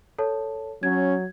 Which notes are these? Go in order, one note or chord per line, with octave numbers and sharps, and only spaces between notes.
A4 C#5 A5
F#3 C#4 G#6